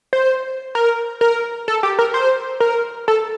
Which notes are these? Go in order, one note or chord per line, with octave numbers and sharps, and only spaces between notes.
C5
A#4
A#4
A4
G4
A#4
C5
A#4
A4